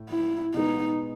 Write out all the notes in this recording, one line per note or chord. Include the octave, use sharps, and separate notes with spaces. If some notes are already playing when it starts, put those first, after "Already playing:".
Already playing: A2
E4
B2 G#3 B3 D#4